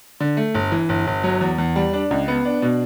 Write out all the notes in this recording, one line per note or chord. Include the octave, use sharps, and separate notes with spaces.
D3
A3
G1
E3
G1
G1
F#3
E2
E2
G3
D4
C#2
B3
D4
B2